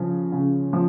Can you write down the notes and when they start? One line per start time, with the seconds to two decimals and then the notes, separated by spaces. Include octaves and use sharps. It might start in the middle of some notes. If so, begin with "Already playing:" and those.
Already playing: C#3 F3
0.32 C#3
0.73 F3